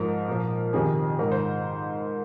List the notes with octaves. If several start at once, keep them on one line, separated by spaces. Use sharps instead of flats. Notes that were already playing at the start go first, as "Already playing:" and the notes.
Already playing: G#2 F3 A#4
A#2 F3
F2 C3 D#3 G#4
G#2 D#3 A#4
C5